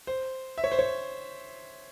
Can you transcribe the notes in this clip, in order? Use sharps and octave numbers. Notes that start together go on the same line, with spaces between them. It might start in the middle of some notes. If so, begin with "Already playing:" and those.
C5
E5
C#5
C5
C#5